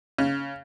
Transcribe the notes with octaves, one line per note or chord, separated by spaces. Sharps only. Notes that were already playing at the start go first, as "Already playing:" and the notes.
C#3